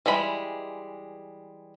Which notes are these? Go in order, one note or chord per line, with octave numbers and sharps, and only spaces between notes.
E3 G3 G#3 B5